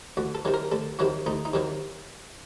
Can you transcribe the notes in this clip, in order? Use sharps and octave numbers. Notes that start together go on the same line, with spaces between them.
D2 F#4
A4
C3 D#3 F#3
A#4
D2 A4
C3 D#3 F#3 F#4
D2 D#4
D#4
C3 D#3 F#3